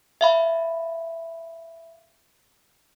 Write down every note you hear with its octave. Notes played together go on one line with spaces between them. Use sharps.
E5 F5 B5